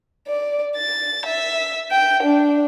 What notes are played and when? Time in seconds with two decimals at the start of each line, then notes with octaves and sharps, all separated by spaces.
0.28 D5
0.77 A6
1.25 E5
1.91 G5
2.23 D4